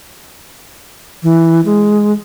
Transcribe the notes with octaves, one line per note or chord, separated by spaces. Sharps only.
E3
G#3